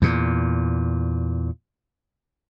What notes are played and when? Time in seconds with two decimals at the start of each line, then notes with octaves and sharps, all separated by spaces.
0.02 E2 A#2